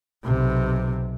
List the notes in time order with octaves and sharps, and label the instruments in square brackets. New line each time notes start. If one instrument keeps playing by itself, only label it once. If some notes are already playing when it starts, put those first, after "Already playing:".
[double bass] B1 C3